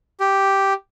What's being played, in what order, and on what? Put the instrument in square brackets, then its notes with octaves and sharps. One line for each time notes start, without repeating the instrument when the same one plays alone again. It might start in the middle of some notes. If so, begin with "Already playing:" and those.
[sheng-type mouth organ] G4